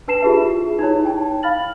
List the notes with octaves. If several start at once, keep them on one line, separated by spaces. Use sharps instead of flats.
D4 B4 A5 C7 E7
E4 F4 G4 G#4 B4 E5
D#4 E4 C#5
G5 A5
F5 B5 F6 A6 F#7